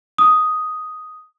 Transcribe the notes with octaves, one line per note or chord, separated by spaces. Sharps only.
D#6